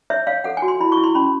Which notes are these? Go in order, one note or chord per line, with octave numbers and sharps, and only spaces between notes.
C#5 E5
C#5 F5
A4 F#5
G#5
F#4
C6
E4 B5
C#6
E4
C6
C#4 B5